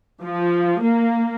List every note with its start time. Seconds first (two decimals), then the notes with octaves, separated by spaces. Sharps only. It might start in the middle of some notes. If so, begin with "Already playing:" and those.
0.24 F3
0.82 A#3